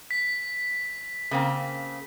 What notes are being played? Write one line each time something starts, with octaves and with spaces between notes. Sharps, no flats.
B6
C#3 A#3 C4